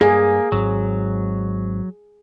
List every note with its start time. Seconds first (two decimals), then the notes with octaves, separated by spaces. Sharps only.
0.01 G2 A#3 G#4
0.52 G#1 G#2 F#3 C4